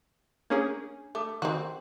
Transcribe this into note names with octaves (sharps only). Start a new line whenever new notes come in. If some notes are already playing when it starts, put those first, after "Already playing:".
A#3 C#4 D4 G#4 C#5 G#5
A3 A4 D6
D#3 C4 F#4